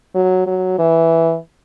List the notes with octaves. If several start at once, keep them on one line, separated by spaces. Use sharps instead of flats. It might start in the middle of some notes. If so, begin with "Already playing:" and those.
F#3
F#3
E3